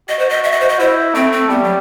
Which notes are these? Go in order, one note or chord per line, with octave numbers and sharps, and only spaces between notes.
F#4 D#5
C5
D#5
E5
D#5
C5
D#5
E4 C5
A3 C4
C4
G3 B3
F#3